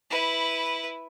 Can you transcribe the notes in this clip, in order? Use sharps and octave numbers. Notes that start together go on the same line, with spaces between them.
E4 B4